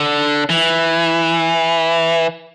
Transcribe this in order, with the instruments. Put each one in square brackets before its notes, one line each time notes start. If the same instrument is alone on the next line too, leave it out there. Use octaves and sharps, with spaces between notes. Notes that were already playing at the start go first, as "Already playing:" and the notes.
Already playing: [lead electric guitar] D3
E3